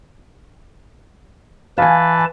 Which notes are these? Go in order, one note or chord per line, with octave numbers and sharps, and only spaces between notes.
E3 B4 F5 G#5 A5